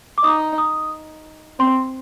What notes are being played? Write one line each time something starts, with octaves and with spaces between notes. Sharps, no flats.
D6
D#4 D#6
D#6
C4 C6